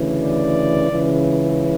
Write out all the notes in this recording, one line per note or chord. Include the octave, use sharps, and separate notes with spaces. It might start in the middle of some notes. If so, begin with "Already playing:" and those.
Already playing: D2 C#3 E3
D5
C#2 C#3 E3